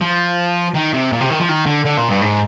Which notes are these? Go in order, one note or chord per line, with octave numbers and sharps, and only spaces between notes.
F3
D#3
C3
A#2
C3
D#3
F3
D#3
D3
D3
A#2
G2
G#2